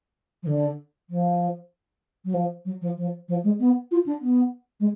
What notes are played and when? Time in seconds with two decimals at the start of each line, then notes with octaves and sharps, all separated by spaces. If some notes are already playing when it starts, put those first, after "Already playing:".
0.43 F3
0.47 D3
1.10 F3
2.25 F#3
2.34 F3
2.65 F#3
2.82 F3
2.97 F3
3.29 F3
3.44 G#3
3.60 B3
3.91 F4
4.06 D4
4.22 B3
4.80 G#3